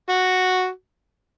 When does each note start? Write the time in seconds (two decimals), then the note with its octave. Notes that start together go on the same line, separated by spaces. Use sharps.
0.09 F#4